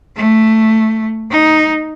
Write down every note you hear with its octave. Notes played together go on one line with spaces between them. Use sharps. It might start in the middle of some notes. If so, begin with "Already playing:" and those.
A3
D#4